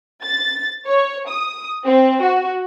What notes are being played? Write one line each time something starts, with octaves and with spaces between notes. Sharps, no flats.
A6
C#5
D#6
C4
F#4